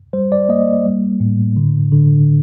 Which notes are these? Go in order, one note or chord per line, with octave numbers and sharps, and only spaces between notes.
G3 C5
D5
A#3 D#5
G3
A2
D3
D3